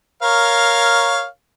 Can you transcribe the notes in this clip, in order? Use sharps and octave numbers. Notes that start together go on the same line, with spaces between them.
A#4 C#5 F5